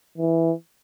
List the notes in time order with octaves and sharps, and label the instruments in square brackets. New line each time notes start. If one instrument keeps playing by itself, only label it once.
[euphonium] E3